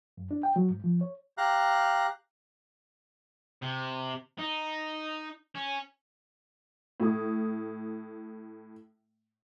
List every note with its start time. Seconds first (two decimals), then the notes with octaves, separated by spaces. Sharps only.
0.17 F#2
0.31 D4
0.43 G5
0.56 F#3
0.70 G#2
0.84 F3
1.01 C#5
1.38 G4 F5 A#5 F#6
3.63 C3
4.38 D#4
5.55 C#4
7.00 A2 D#6